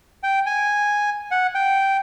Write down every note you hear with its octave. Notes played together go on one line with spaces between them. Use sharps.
G5
G#5
F#5
G5